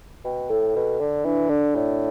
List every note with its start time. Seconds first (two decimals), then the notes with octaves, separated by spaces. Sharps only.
0.25 B2 G5
0.50 A2 A4
0.75 B2 A4
1.00 D3 D5
1.25 E3 D4
1.50 D3 D4
1.75 A2 D5